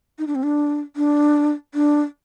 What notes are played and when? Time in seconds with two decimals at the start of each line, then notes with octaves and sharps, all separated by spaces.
0.19 D#4
0.27 D4
0.35 C4
0.43 D4
0.96 D4
1.74 D4